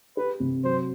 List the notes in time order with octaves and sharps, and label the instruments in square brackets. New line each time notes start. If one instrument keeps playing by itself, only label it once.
[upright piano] G4 [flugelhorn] B4
[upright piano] C3
[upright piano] F#3 [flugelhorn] C5